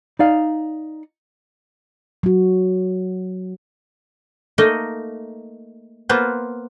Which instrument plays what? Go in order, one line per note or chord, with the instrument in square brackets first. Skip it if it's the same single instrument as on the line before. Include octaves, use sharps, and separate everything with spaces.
[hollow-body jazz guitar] D#4 D5 F5
[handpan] F#3 F#4
[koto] A3 A#3 D#4 D#5
A#3 B3 F4 B4 C5